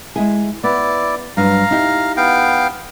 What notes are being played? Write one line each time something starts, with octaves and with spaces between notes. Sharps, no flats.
G#3 E4 G#4
B3 E4 D5
G2 F#3 D4 F5 A#5
D#4 E4 G4
B3 F5 G5